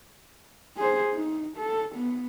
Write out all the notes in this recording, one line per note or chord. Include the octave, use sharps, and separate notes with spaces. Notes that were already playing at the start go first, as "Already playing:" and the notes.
G#4 C5
D#4
A4
B3